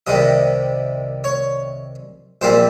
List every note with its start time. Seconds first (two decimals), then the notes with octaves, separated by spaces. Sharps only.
0.07 C2 C3 D#3 G3 D#5
1.24 C#5
2.41 A#1 A#2 G3 C4 C5